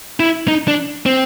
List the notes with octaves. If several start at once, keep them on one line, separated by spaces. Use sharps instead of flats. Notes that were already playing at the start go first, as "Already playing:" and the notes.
E4
D#4
D4
C4